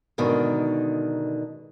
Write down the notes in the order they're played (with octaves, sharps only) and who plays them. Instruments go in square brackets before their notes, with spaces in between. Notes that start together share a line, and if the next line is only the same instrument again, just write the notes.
[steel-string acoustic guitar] G#2 B2 D3 D#3